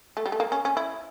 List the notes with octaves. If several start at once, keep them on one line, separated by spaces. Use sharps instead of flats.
A3
G3
A3
A#3
C#4
C#4
E4